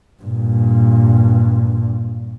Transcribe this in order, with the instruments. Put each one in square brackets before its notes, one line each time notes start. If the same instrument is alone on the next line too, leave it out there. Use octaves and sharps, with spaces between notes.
[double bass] G2 A#2